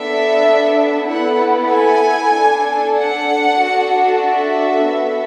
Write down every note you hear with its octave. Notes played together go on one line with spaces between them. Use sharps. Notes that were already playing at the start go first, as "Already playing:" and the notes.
Already playing: B3 D4 A4 E5
B3 E4 A4 F#5
G#5
D4 A4
F#5
D4 F#4 A4
E5
B3 F#4 A4